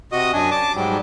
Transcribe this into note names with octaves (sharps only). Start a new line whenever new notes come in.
C3 F#4 D#5 D#6
F#2 D4 G#5
A5 D6
G#2 F#3 G3